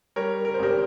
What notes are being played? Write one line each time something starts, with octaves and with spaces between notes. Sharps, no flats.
G3 A#4 C#5
A#4
C5
G#1 G4 A#4